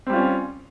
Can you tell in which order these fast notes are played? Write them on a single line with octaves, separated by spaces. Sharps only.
C4 G3 F4 C#4